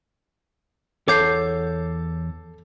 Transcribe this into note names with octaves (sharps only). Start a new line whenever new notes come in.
E2 A4 C#5 F#5 D6 G6 C7